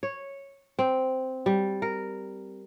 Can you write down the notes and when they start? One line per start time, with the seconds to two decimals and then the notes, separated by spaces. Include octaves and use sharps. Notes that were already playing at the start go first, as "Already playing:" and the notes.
0.03 C#5
0.79 C4
1.46 G3
1.82 A#4